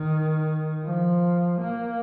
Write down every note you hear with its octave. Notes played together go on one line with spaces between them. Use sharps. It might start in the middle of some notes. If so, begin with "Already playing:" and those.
Already playing: D#3
F3
A#3